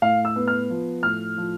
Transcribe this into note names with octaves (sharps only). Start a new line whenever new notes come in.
A2 F5
E6
B3
F6
F3
A2 F6
F3